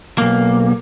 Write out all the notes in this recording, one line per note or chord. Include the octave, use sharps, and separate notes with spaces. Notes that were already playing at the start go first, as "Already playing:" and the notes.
B1 A#3